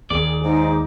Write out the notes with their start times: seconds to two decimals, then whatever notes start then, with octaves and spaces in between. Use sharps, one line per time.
0.10 D#2 D#3 G#4 D5
0.43 G#2 D#4